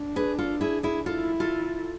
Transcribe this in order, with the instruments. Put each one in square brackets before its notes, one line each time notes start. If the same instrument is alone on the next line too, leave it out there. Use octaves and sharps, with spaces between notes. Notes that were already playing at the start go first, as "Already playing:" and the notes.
Already playing: [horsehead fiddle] D4
[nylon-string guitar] G#4 B4
F4 A4
E4 G#4
E4 G#4
[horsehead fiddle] E4 [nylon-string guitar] F4 A4
[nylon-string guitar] F4 A4